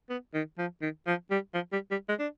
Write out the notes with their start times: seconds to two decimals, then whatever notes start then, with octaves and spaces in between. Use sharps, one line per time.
0.10 B3
0.34 D#3
0.58 F3
0.82 D#3
1.07 F3
1.31 G3
1.54 F3
1.73 G3
1.91 G3
2.09 G#3
2.19 D4